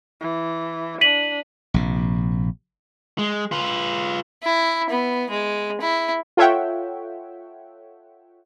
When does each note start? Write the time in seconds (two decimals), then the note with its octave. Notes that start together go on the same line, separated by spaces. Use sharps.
0.21 E3
1.01 D4 B6 D#7 F#7
1.74 A#1 C3
3.18 G#3
3.51 F4 B4
4.44 E4
4.90 B3
5.30 G#3
5.81 E4
6.37 F4 A4 C#5 E5 F#5 G5